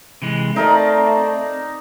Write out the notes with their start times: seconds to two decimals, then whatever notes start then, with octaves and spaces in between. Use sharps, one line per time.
0.22 C3 E3 G#3
0.56 A3 C4 D#4 A#4 D5